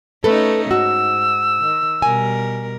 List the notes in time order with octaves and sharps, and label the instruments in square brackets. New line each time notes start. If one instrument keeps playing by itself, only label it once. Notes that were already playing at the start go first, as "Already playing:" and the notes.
[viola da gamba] A3 C#4 D#4 [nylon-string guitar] A4 B4
[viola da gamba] G#2 [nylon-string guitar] F#4 [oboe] E6
[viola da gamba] D#3
[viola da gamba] B2 G3 A#4 [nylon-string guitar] G#5